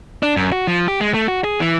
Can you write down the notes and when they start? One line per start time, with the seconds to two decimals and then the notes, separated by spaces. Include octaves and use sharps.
0.23 D4
0.37 F#2
0.52 F#4
0.67 F3
0.88 G4
1.01 G#3
1.14 A3
1.28 F#4
1.44 G#4
1.60 E3